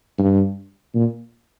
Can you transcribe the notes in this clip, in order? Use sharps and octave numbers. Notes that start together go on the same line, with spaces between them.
G2
A#2